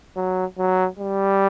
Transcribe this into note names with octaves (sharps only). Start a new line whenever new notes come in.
F#3
F#3
G3